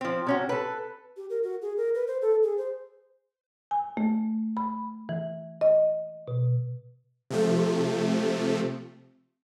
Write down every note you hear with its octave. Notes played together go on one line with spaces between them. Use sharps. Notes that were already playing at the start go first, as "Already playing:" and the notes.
F3 C4
C3 C#4 F#4
A4 B4
G4
A#4
F#4
G#4
A#4
B4
C5
A4
G#4
C5
G#5
A3
B5
E3
D#5
B2
C3 F3 A3